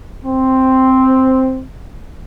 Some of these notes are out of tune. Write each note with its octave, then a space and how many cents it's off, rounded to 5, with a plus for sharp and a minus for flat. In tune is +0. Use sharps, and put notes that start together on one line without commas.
C4 +0